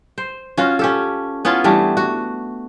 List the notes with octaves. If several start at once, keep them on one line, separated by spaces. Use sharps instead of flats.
C5
C#4 F4 F#4
C#4 G4 A4
B3 C#4 E4 F4
E3 G3 A3 D4
F#4